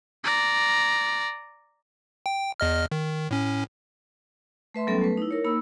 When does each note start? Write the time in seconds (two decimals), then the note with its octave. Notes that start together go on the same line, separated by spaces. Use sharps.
0.24 D5 A#5
2.26 G5
2.60 E2 D#5 F6
2.92 D#3
3.31 A2 C#4
4.74 A3 B4 E5 C6
4.87 F#3 G3 B3 C#4 A4
5.01 A3 B4
5.17 D#4 E4
5.31 A#4 C#5
5.44 A#3 D#4 B5 E6